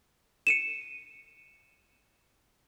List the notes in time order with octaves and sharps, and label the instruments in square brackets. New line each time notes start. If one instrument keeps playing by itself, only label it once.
[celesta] C#7 D#7 E7